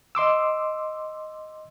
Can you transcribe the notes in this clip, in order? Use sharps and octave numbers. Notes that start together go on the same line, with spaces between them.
D#5 C6 D6 E6